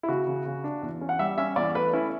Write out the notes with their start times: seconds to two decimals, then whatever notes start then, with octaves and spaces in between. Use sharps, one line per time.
0.03 E4
0.09 C#3 F#4
0.27 C#3
0.45 C#3
0.64 D4
0.82 E2
1.01 C#4
1.09 F#5
1.19 G3 E5
1.38 C#4 E5
1.56 E2 D5
1.75 A3 B4
1.93 C#4 E4